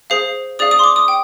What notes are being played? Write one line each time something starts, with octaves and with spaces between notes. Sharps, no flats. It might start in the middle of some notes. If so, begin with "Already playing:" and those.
G#4 C5 F5 C7
G#4 D5 F5 D#6
D#6
C6
D6
D#6
G5